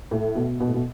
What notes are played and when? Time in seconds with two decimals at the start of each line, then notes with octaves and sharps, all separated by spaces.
0.11 A2
0.35 B2
0.60 B2
0.68 A2
0.74 B2